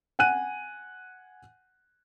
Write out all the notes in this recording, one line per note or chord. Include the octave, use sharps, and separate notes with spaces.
F#5 G#5 F#6 D#7